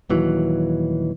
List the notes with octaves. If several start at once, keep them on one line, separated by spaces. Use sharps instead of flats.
D#1 D#2 E3 F#3